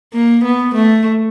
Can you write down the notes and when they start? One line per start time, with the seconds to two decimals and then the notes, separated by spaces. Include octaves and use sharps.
0.13 A#3
0.44 B3
0.75 A3